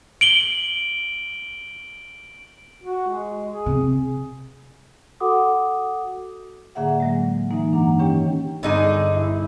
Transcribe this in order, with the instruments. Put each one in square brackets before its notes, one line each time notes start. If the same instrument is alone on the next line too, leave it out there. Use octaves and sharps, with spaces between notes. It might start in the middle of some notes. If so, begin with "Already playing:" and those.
[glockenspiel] D7 F#7 G7
[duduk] F#4
G#3
G#4
[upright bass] C3
[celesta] F#4 A4 F#5 D6 D#6
[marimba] A2 D3 A#3 G#4 E5 F#5
F#3 G#3
E3 G#3 A#3 D#4
G2 D4 F#5 A#5
D#3 C#4 G4 C#5 G5
[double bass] G1 [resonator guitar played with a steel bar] D3 D#4 G#4
[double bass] G1 E4